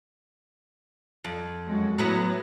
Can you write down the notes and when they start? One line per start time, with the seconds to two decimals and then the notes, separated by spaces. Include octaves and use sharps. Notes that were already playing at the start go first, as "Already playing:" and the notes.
1.24 F2
1.67 F#2 G#3 F#4
1.98 A2 F#3 B3 B4